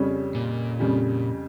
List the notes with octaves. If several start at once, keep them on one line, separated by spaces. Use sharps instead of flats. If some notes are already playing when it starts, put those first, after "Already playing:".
Already playing: F2 C#3 G3 C#4
A#2
F2 C#3 G3